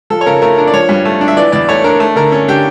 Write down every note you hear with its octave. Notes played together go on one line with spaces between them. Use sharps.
F3 A4
C#5
C#3 A#4
A3 A#4
D4 A#4
D5
F3 C#5
G2
A3
D4
E5
E3 D5
E2 D5
A3 C#5
D4 A#4
A3
D3 A#4
C#4
D3 G4